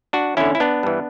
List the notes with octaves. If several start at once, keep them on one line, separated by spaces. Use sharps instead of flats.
D4 F#4
E2 D3 C#4 E4
E4
B3 D4
G2 E3